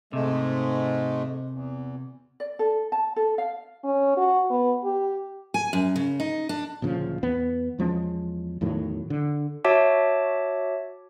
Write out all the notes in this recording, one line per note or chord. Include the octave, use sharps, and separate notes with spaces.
G#2 C3 G#3 A3
E2
D5
A4
A5
A4
F5
C#4
F#4
B3
G4
G#5
F#2
C#3
D#4
D4
D1 A#2 C#3 F3
E2 B3
E2 F3 G#3 C#4
E2 A2 D#3 F#3
D3
F#4 C#5 E5 A5 D6